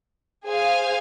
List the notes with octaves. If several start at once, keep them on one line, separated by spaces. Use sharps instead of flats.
G#4 C5 F5 G#5